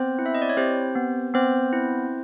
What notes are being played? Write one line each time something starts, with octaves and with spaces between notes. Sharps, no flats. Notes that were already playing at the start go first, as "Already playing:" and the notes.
Already playing: B3 C4 C5
E4
E5
D#5
D5
C#5
C4 G4 C5
B3
B3 C4 C5
E4